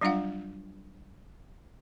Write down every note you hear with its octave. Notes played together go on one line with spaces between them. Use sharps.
F#3 G3 D4 F4 F5 F#5